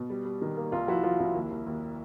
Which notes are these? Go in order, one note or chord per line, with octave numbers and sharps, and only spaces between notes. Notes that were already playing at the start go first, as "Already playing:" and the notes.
Already playing: B2
G3
G3
D#3
A#3
C2 F4
F3 E4 F#4
F3 F4
C2 E4
D#2
D#2
D#2